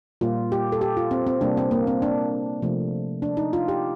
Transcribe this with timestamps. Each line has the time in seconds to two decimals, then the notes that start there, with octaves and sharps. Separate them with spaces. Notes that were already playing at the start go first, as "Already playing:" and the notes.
0.21 A#2 G3 A#3 F4
0.52 G4
0.72 A4
0.81 G4
0.97 F4
1.11 C4
1.27 C4
1.41 C3 G3 A#3 D4
1.57 C4
1.71 A#3
1.87 C4
2.02 D4
2.62 C3 F3 A3
3.22 D4
3.37 D#4
3.53 F4
3.68 G4